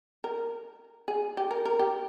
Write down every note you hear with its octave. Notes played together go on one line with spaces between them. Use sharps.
A#4
G#4
G4
A#4
A#4
G4